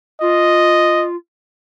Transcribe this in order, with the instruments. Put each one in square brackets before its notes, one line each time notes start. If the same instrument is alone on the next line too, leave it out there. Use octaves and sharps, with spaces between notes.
[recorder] F4 [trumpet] D#5